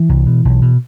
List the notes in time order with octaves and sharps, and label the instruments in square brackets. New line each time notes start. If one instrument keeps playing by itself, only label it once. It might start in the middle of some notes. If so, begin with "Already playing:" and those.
Already playing: [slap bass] E3
C2
B2
B1
B2